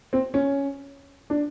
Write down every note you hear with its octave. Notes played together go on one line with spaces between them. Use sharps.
C4
C#4
D4